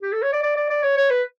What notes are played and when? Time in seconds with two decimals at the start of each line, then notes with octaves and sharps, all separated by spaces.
0.02 G4
0.12 A4
0.22 C#5
0.33 D5
0.43 D5
0.56 D5
0.70 D5
0.83 C#5
0.97 C#5
1.10 B4